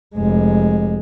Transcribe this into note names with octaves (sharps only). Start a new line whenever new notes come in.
F1 G#3